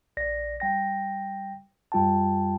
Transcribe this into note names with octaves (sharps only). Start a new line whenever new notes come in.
A#1 D5 A#6
G3 G5 A#6
F#2 G3 F4 G5 A5